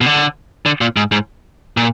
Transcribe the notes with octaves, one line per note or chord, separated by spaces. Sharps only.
B2
D3
D3
A#2
G#2
G#2
A#2